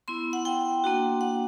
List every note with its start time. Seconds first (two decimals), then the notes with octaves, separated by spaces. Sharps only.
0.08 B3 E4 C6
0.33 F#5
0.45 G5
0.84 A#3 D4 F#4
1.21 F#5